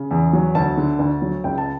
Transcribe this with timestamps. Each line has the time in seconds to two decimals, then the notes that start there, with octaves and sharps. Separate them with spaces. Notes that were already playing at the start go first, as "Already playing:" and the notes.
Already playing: C#3
0.11 E2
0.33 F#3
0.55 D2 A5
0.77 D3
0.99 D2
1.22 F#3
1.44 C#2 G5
1.58 A5